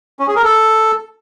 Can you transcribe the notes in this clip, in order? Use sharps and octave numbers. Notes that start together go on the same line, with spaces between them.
C#4
G#4
A#4
A4